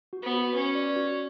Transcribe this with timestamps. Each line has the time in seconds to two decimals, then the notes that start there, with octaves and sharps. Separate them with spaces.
0.13 F#4
0.23 B3
0.34 F#4
0.54 C#4 B4
0.75 D5
0.96 F#4